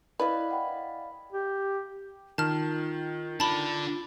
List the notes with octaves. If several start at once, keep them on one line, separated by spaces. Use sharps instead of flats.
E4 B4 D5 D#5 F5
F#5 G5 B5
G4
D#3 F4 A5 F6
D3 D4 F4 A5 B5